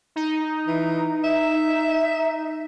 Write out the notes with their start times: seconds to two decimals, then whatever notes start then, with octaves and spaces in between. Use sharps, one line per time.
0.16 D#4
0.67 E3
1.24 E5